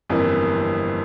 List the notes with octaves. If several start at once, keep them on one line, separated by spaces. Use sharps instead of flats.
G1 F2 E3 A#3